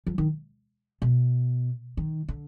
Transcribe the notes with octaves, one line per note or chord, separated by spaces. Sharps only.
F3
D#3
B2
D#3
D3